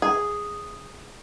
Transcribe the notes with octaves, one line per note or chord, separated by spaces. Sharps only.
G#4